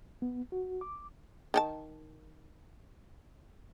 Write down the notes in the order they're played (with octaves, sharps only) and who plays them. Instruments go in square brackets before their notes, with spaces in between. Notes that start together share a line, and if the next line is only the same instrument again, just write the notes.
[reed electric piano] B3
F#4
D6
[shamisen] D#3 D#4 A5